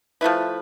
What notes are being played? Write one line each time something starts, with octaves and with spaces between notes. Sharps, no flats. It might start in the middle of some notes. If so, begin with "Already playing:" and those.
F3 A3 E4 B4